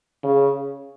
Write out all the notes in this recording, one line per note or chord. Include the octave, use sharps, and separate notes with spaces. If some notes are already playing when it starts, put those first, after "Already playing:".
C#3